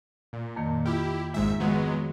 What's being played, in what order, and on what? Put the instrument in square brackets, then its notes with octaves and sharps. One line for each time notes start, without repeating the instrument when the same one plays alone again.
[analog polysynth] A#2
[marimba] F2 D#3 A#3
[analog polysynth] E4 G4 [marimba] F4
[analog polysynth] G#1 G#2 E5 [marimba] G#3
[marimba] D#3 F3 [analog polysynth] F#3 G#3 B3